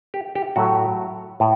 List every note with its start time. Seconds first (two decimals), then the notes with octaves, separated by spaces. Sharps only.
0.14 G4
0.35 G4
0.56 A2 F#3 A3 F#4
1.40 A2